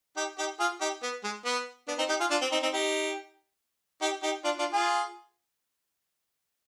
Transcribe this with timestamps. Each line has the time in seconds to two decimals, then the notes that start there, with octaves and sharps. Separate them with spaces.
0.17 D#4 G4
0.38 D#4 G4
0.59 F4 G#4
0.81 D#4 G4
1.02 B3
1.24 G#3
1.45 B3
1.88 B3 D4
1.98 C4 D#4
2.09 D#4 G4
2.20 F4 G#4
2.30 D4 F4
2.41 C4
2.52 C4 D#4
2.63 C4 D#4
2.73 D#4 G4
4.02 D#4 G4
4.23 D#4 G4
4.44 D4 F4
4.59 D4 F4
4.73 F4 G#4